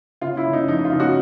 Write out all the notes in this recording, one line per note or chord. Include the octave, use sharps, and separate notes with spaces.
C#3 F4
E4
C#3
D#4
F2 D#4
F4
C#3
F#4